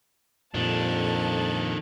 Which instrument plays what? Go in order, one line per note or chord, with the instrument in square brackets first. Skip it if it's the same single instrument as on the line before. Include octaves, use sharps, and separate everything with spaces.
[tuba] F2 [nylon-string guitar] A#2 G3 [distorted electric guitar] D#3 D4 [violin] A4 A5